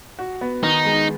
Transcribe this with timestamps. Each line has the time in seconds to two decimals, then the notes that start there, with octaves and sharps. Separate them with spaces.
0.19 F#4
0.41 B3
0.63 D#3 D#4
0.85 G#3